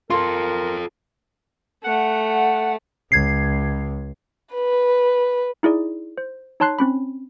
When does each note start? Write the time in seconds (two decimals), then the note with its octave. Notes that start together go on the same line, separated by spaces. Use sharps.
0.10 F4 A4 A#4 C6
1.84 A3 F#5
3.12 C#2 G#6 C7
4.53 B4
5.63 D#4 E4 G#4 D5
6.18 C5
6.60 D#4 C#5 A5 C6 F#6 C7
6.79 C4 C#4 B5